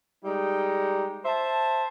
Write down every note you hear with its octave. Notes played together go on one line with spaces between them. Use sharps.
G3 G#3 D#4
C5 E5 A5